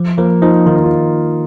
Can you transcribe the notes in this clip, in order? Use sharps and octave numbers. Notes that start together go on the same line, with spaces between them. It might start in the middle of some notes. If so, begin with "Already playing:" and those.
Already playing: F3
F3 A#3
F3 D#4
D#3 F4
D#4
F4